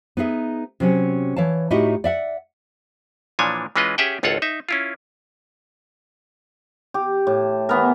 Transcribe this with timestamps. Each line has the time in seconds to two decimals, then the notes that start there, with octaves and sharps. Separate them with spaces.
0.17 B3 D#4 G#4 E5
0.80 C3 F#3 C#4
1.36 E3 C#5 F5 A5
1.70 A2 D#4 E4 F#4 G4 D#5
2.04 D5 E5 F#5
3.39 A#2 E3 F3 D4 C#5 G#5
3.76 E3 G#3 C#4 F4 B4 D#5
3.98 C#4 G4 G#4 E5 F#5 G5
4.23 G#1 C#2 F4 A4 C#5 F#5
4.42 D#4 E5
4.69 C#4 E4 F4
6.94 G4
7.27 A2
7.69 E3 B3 A#4